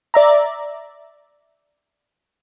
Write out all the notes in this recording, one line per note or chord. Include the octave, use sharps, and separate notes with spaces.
D5 E5 A#5